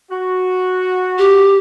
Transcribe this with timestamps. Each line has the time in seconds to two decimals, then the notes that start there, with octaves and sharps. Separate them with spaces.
0.11 F#4
1.19 G4